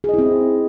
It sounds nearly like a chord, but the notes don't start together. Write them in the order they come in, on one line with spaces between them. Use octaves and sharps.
G#4 D#5 E4 C4